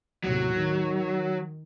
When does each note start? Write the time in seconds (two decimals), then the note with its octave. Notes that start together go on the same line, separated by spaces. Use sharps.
0.24 D#2 A2 C3 F#3
0.53 D#3